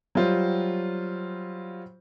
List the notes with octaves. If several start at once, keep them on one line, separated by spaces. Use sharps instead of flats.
F#3 G3 F4 C5